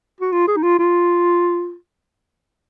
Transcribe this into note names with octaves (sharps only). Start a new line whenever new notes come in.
F#4
F4
G#4
D#4
F4
F4